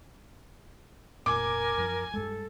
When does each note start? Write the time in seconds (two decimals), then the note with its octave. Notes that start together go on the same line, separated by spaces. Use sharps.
1.26 F1 A#2 A#4 G#5 D6
1.78 F#2 F3
2.14 G2 G#3 A4